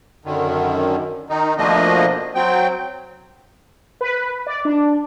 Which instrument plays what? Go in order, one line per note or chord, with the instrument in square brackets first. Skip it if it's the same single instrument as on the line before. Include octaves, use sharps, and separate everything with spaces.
[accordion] F#2 D3 D#3
D#3 D#4
B2 F3 A3 A#3 D4 D#5
F#3 C4 G5
[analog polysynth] B4
D5
D4